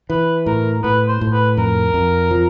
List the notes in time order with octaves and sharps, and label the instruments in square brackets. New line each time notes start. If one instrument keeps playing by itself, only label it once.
[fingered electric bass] E3 [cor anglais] B4
[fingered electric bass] A2 [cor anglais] A#4
[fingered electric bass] A2 [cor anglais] B4
[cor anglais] C5
[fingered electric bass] A2
[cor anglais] B4
[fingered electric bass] F2 [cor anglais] A#4
[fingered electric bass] F2
F3